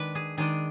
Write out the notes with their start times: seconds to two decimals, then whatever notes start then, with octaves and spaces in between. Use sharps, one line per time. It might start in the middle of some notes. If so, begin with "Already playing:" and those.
Already playing: D#3 G#3 D4 B4
0.15 G#4
0.37 D#3 G#3 D4 G#4